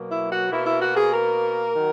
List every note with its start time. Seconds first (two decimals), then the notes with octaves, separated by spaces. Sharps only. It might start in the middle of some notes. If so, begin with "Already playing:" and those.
Already playing: B2 F#3 A#3
0.11 E4
0.31 F#4
0.51 B2 A#3 E4
0.66 E4
0.82 F#4
0.96 G#4
1.11 A#4
1.74 D#3 F#3